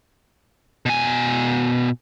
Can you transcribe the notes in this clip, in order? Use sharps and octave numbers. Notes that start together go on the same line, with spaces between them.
B2 G#5